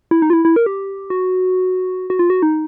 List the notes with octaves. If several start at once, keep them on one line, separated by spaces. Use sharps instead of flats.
E4
D#4
F4
E4
E4
A#4
G4
F#4
F#4
F4
F#4
D#4